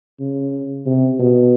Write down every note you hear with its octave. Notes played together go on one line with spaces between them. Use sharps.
C#3
C3
B2